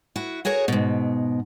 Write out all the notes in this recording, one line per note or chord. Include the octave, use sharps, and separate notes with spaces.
E4 F#4
F#4 G#4 A#4 C#5
G#2 B2